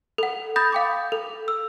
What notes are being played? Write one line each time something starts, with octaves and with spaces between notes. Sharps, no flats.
A4 F#5
B5 D#6 G6 A6 A#6
F5 G5 D6
A4
E6